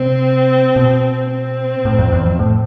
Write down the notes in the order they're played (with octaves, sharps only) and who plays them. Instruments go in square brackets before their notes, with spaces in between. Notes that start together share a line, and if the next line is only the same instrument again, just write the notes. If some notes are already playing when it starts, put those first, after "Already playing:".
Already playing: [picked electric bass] C3 [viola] C4
[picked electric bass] B2
[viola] C4
[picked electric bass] A2
F2
E2
F2
A2